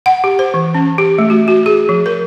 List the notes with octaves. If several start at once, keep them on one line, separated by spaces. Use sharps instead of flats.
F#5
G4
C5
E3
C#4
G4
A3
F#4
F#4
G#4
F3
A#4